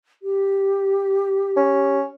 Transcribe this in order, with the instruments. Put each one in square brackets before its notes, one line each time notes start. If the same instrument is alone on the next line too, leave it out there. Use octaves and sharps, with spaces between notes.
[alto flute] G4
[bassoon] C#4